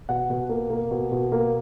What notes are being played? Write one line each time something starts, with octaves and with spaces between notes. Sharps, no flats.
B2 F#5
B2
A#3
A#3
B2
B2
A#3